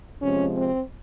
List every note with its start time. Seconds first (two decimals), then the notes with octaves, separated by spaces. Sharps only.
0.22 C3 F3 G#3 C#4
0.56 C4